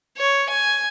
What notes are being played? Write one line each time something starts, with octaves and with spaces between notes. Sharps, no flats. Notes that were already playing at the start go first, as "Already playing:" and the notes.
C#5
G#5